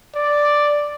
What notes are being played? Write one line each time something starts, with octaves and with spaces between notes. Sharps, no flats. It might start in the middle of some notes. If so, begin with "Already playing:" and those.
D5